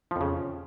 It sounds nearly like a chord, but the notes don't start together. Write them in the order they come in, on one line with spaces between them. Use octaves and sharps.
F3 F2 C#3